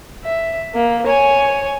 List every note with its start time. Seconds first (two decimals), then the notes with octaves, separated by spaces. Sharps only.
0.25 E5
0.74 A#3
1.06 C#5 G#5